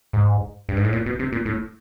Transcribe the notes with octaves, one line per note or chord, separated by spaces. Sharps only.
G#2
G2
G#2
A2
A#2
B2
C3
A#2
A2